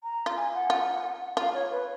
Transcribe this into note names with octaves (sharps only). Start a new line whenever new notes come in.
A#5
F4
G#5
F#5
F4
F4 F5
C#5
B4